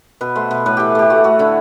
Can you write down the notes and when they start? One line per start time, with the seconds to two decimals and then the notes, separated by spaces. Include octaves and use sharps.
0.21 B2 B4
0.35 A3 C5
0.51 B2 B4
0.66 A2 B4
0.77 E3 G4
0.95 A3 G4
1.10 A3 F#4
1.24 A3 F#4
1.39 D3 E4